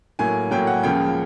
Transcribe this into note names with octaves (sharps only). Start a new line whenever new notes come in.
A2 F#3 A#3 G#5
A2 F#3 A#3 G5
F#5
C#2 C#3 F3 A#3 G5